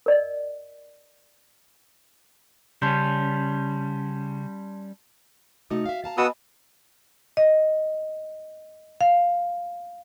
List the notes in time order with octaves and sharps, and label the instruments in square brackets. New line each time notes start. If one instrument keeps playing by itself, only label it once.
[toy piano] A#4 D5 D#5
[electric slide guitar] C#3 [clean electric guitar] G3 C#4 [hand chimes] A5 C6 G6
[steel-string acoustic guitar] C3 A3 D#4 [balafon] F#4
[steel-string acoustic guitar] E5 F5
F5 A5 A#5
[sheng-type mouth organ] B3 D#6 E6 [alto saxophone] F#4 [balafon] D#5 G#5 B5
[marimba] D#5
F5